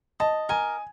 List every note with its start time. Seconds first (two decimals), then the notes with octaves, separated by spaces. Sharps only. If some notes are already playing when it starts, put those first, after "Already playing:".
0.20 D#5 A5
0.49 A#4 G#5